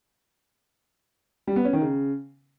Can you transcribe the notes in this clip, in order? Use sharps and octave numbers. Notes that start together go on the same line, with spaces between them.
G3
B3
C#4
D#3
C#3